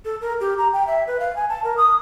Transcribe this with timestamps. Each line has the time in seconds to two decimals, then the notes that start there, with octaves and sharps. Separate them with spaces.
0.05 A4
0.21 A#4
0.41 G4
0.58 A#5
0.73 G5
0.87 E5
1.07 B4
1.20 F5
1.36 G#5
1.49 A5
1.64 A#4
1.77 D#6